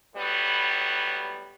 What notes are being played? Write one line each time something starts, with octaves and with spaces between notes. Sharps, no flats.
A2 F#3 G3 B3